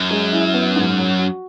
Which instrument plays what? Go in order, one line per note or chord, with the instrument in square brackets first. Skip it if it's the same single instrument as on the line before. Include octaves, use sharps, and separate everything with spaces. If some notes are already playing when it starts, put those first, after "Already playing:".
Already playing: [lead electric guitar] F#2
[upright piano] G#3
E4
B3
G#2
F#3
F#4